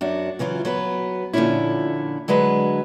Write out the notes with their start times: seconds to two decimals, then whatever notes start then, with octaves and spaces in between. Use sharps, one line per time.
0.01 F#2 D4 F#4
0.39 C#3 E3 F#3 F4
0.65 F#3 B3 B4
1.33 A#2 D3 F3 F#3 C#4 E4
2.28 D3 F#3 G#3 B4